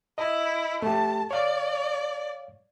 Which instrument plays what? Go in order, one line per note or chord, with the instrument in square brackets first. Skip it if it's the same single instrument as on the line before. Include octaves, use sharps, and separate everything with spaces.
[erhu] E4 [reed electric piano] D#5
[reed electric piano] A3 G4 [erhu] A5
[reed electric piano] C#5 F5 [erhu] D5